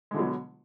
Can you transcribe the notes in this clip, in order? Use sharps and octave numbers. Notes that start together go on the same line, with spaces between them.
B2 D3 F#3 G#3